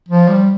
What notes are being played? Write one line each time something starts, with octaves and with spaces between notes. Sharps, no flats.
F3
G3